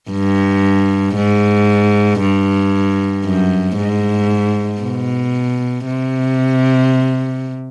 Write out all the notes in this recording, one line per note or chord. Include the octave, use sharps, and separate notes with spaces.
G2
G#2
G2
F#2
G#2
B2
C3